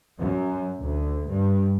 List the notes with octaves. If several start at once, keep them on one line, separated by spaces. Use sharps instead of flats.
F#2
D2
G2